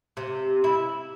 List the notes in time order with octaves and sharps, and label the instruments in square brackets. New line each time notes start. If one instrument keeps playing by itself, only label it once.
[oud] C3
E4